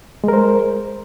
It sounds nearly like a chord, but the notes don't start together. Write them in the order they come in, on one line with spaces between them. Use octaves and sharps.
G#3 A#4 C5